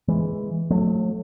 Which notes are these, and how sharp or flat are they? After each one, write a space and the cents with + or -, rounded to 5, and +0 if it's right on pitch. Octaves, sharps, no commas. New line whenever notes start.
E3 +0 G#3 +0
F#3 -40 A3 +0